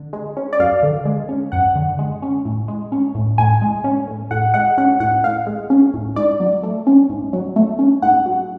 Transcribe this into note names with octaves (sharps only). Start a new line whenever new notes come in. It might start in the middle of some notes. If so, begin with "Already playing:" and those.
Already playing: D3
G#3
C#4
D5
F#2 F5
D3
G#3
C#4
F#2 F#5
D3
G#3
C#4
A2
G#3
C#4
A2
A2 G#5
G#3
C#4
A2
A2 F#5
G#3 F#5
C#4 F#5
A2 F#5
A2 F5
G#3
C#4
A2
G#2 D5
F#3
A3
C#4
G#2
F#3
A3
C#4
G#2 F#5
F#3